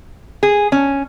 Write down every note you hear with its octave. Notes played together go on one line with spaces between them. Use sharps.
G#4
C#4